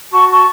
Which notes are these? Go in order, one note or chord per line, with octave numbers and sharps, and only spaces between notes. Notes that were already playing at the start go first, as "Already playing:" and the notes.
F#4 A5 C#6
A5 C#6